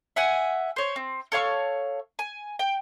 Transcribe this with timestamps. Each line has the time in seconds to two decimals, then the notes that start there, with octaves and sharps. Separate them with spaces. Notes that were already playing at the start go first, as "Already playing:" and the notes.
0.16 E5 F#5 G#5
0.76 C5 C#5
0.96 C4
1.32 A4 C#5 F5 C#6
2.19 G#5
2.59 G5